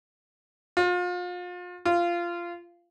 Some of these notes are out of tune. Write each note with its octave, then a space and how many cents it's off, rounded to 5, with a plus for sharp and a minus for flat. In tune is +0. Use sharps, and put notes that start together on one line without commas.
F4 +35
F4 -15